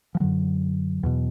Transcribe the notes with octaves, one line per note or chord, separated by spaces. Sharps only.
F3
F#2 D3 F#3
E2 B2